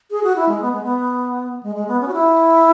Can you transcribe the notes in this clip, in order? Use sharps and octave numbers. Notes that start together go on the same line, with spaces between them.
G#4
F#4
E4
G#3
B3
G#3
B3
G#3
G#3
B3
C#4
F#4
E4